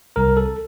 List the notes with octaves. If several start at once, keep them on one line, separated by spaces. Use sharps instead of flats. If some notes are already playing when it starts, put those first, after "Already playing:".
C2 A#4
A4